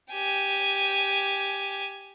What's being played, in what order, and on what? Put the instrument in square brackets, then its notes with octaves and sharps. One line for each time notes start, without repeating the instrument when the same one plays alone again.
[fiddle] G4 G#5